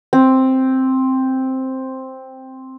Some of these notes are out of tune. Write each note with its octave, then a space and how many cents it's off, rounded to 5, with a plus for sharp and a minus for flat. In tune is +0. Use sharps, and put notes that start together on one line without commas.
C4 +5